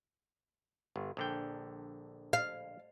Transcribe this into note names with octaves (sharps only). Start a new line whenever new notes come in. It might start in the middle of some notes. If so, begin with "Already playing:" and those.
G1
A#1 D3 G5
F5